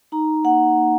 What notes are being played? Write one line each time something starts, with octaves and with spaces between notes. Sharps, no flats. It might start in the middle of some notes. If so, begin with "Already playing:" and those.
D#4 A#5
A#3 F#5
A#3